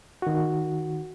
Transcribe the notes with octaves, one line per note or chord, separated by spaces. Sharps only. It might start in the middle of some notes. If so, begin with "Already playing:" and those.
D#3 F#4